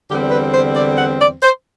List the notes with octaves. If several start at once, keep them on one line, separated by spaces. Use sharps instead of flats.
E2 D3 G3 C4 G4
B4
C5
D5
F#5
D5
C5